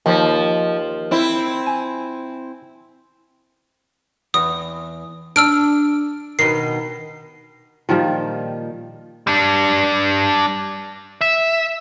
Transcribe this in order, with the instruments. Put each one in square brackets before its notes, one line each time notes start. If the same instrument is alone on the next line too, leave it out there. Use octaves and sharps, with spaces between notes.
[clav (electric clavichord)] D#2 [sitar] F3
[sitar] C4 E4
[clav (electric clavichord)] G#5
[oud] E2 [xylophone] D#6
[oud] D4 [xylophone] E6 F6 D7
[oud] B2 D#3 [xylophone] C7
[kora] A#2 D#3 F3 G3
[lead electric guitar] G3 D4
E5